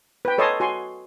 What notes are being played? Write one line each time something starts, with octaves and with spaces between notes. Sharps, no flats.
B4 G5
A4 C#5 D#5 A5 C6 D#6
F#4 G#5 C6 C#6